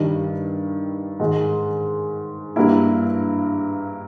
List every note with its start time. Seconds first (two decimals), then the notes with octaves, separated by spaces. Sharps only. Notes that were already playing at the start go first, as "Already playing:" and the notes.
Already playing: G2 D#3 G3
1.20 G#2 D#3 G#3
2.56 G2 G3 A#3 E4